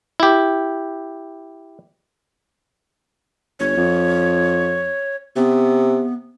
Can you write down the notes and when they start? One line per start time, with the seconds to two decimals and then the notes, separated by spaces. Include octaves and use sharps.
0.20 E4 G4
3.60 G1 C#5
3.77 F2
5.36 C3 B3